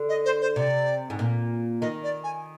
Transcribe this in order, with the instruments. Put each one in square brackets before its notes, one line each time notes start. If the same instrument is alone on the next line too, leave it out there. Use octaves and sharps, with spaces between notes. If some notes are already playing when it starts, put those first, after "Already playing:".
Already playing: [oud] D3
[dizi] D#5
C5
C5
[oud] C3 [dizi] D5
[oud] G#2
A#2
[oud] D#3 [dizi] D#5
[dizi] D5
G#5